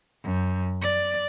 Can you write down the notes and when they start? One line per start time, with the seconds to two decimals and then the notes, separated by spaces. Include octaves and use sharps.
0.23 F#2
0.81 D5